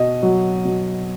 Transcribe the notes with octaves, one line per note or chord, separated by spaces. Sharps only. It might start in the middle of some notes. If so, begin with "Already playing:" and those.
Already playing: B2 D#5
F#3
B2